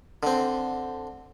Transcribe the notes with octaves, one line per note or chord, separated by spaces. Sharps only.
D3 C4